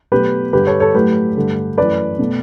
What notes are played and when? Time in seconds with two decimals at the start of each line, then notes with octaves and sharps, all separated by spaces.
0.12 B2 F#3 A3 G4 B4
0.53 G2 D3 G3 G4 B4
0.67 A4 C#5
0.80 A4 C#5
0.94 A2 F#3 A3 G4 B4
1.36 G2 D3 A3
1.77 F#2 E3 A3 B4 D5
2.19 B2 A3